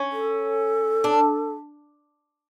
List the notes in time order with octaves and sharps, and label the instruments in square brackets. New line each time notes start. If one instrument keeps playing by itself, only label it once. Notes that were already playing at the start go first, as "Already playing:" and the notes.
Already playing: [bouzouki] C#4
[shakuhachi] A4
[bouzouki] D4